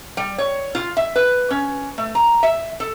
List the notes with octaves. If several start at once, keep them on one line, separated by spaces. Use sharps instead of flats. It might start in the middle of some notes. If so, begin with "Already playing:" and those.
G3
C#5
F4
E5
B4
C#4
A3
A#5
E5
A4